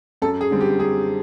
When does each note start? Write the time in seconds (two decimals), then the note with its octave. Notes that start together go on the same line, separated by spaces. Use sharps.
0.22 F#2 A4
0.41 G#4
0.51 D3 G3 C4
0.61 G4
0.80 F#2 G#4